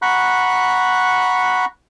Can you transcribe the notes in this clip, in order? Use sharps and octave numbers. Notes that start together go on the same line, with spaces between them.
F#5 A#5 B5 C#6 F#6